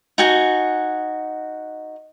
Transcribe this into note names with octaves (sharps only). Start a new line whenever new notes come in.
D#4 F#4 G#5